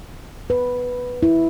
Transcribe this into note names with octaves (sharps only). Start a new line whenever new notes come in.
B4
E4